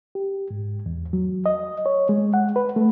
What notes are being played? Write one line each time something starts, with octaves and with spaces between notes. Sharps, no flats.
G4
G#2
E2
F#3
D#5
C#5
G#3
F#5
B4
A3